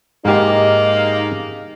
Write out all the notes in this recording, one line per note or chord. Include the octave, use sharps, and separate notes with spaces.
G#2 D#3 G#3 A#3 D#4 G4